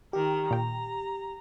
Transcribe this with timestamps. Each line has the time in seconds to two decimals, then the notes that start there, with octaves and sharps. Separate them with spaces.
0.13 D#3 G4 A#4
0.51 A#2 G5 A#5